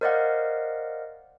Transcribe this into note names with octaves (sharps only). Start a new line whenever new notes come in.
A#4 C5 D5 D#5 F5 F#5